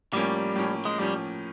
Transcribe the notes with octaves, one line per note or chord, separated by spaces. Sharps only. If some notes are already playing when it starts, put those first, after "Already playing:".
A2 F3 G3 A#3 C#4
A2 F3 A#3 C#4
G#3
A2 F3 G3 A#3 C#4